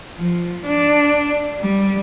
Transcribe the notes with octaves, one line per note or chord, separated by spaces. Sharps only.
F3
D4
G3